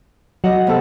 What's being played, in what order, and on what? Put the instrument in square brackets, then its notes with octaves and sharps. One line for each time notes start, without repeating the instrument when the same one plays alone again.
[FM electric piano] F#3 [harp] D#5 F#5
[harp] C3 B3 A4